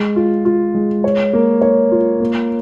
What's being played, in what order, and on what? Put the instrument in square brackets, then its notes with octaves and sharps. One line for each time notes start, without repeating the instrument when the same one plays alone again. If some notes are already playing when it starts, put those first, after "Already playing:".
Already playing: [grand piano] G#3
F4
F4
G#3
C#5
A#3
C#5
F4
A#3